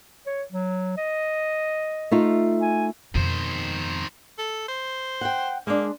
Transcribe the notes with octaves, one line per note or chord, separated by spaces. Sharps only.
C#5
F#3
D#5
A3 D#4 F4
G#5
F2 B2 D#3 C5
A4
C5
F#5 G5
G#3 A#3 D4